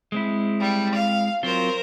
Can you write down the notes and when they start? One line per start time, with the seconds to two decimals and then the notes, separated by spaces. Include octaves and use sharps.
0.12 G#3 C4 E4
0.60 G3
0.93 F5
1.43 F#3 C4 F4 A#4 C5